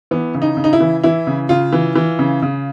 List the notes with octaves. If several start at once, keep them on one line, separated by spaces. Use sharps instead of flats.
E3 B3
C#3
D#4
C#3
D#4
E4
E3
E3 E4
C#3
C#3 F4
E3
E3
C#3
C#3